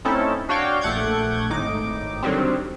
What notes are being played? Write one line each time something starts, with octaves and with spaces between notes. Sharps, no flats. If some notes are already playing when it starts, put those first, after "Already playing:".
A3 C4 C#4 D#4 E4 A4
D4 F#4 C#5 F5 G5
A#1 A3 F#5 D6 G6 G#6
G#1 A2 D#4 D6
D3 D#3 F#3 G3 C4